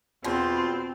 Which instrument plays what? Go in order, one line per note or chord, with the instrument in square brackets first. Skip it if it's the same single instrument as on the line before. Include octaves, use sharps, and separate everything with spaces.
[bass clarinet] E2 [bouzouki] B2 [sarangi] C4 [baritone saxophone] F4